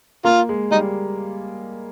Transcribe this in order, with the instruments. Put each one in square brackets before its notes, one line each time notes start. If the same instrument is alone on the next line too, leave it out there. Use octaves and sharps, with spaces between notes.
[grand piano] A#3 [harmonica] F4
[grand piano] G#3
[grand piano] G3 [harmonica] D#4